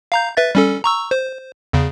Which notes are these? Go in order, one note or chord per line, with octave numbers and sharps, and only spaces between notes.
F5 A#5 G6
B4 E5 A6
G3 C#4 A4
A#5 C#6 E6
C5
E2 C#3